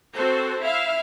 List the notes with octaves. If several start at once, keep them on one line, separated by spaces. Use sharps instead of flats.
C4 F#4 A4 C5
E4 E5 F5